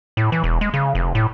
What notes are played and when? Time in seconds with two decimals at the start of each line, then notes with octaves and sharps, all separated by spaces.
0.17 A2
0.32 E3
0.44 E1
0.61 G#3
0.74 C#3
0.95 F1
1.15 A2